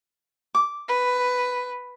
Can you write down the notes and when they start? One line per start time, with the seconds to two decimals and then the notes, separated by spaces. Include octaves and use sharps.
0.55 D6
0.88 B4